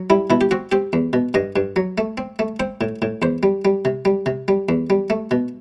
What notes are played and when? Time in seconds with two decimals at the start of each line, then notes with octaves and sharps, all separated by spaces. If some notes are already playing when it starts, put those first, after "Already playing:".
Already playing: F#3
0.10 G3 E4
0.30 B2 E4
0.41 G4
0.51 C4 F#4
0.72 C4 G4
0.93 E2
1.13 B2
1.34 G2 D#5
1.56 G2
1.76 F#3
1.98 A3
2.18 C4
2.39 A3
2.60 C4 C5
2.81 A2
3.02 A2
3.22 E2 C5
3.43 G3
3.65 G3
3.85 C3
4.05 G3
4.26 C3
4.48 G3
4.69 E2
4.90 G3
5.10 A3
5.31 B2